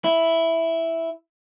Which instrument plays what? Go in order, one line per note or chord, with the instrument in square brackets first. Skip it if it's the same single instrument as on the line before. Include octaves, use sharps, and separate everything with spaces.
[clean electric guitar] E4